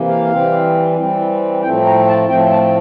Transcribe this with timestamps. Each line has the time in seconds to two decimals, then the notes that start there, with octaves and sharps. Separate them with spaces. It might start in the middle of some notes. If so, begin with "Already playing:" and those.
Already playing: C3 E3 A#3
0.09 F5
0.31 E3 G3 C4
0.97 E3 G3 C4
1.63 A2 F3 A3 C4 G5
1.86 A#5
2.08 A5
2.29 A2 F3 A3 C4 G5
2.51 A5